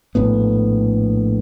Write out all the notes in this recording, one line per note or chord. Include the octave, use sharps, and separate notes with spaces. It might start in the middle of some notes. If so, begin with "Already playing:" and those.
A#1 A2 B3